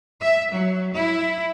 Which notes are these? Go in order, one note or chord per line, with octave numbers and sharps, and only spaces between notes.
E5
F#3
E4